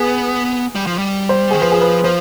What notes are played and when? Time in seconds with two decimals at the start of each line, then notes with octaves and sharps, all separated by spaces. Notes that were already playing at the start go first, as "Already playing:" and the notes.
Already playing: B3 G#4 B4
0.75 G3
0.87 F3
0.98 G3
1.29 C5
1.51 D#3 G#4
1.61 F3 B4
1.72 G#4
1.81 B4
2.04 F3 C5